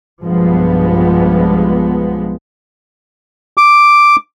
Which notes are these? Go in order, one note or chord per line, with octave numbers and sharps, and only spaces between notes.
B1 G2 F3 G#3 B3
D6